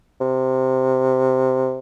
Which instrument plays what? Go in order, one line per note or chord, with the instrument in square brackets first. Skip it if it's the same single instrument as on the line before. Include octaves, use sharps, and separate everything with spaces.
[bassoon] C3